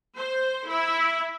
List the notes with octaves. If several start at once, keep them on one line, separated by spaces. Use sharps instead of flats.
C5
E4